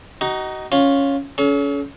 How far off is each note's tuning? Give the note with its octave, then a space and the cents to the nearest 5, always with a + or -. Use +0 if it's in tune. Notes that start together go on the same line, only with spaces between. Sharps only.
D#4 +0 F#4 +35
C#4 +0 F4 +10
C#4 +30 A4 -40